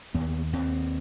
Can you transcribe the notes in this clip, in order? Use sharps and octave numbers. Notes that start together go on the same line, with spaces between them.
D#2 B3
D#2 C4